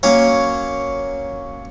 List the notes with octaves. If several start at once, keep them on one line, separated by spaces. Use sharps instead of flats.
F#3 A#3 C#4 C#5